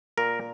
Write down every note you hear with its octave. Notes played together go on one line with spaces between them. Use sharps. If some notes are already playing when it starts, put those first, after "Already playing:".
A#2 A#4